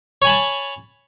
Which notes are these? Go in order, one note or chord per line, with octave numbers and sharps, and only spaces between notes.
C#5 G#5 A5 B5